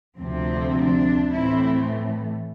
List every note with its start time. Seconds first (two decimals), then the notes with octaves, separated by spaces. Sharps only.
0.18 D2 C3 F3 C4
0.75 D4
1.33 A2 E3 A3 C4 E4